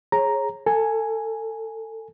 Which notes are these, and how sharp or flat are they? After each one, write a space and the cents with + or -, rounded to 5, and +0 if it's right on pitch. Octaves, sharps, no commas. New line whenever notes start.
G#4 +0 C#5 -30 A#5 +0
A4 +25 G#5 +0